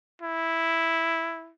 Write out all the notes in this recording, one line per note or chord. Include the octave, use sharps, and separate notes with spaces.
E4